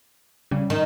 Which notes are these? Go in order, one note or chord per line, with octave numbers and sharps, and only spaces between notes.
C#3 G3
D#3